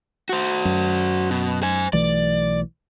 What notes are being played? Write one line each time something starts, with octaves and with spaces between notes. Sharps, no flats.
F#4 C5
F#2
B2
C5 G#5
B1 E3 A3 D5